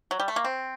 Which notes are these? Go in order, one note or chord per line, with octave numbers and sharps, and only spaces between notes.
F#3
G3
A3
A#3
C4